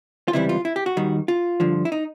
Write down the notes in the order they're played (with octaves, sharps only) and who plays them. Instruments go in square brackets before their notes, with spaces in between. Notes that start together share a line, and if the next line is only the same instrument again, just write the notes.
[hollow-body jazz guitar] F4
C#2 C3 E3 G3 E4
F4
E4
G4
F#4
D#2 D#3 G3
F4
G2 D3 F3
E4
D#4